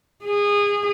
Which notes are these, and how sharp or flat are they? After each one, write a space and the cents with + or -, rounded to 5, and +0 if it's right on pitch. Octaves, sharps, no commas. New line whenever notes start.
G#4 -25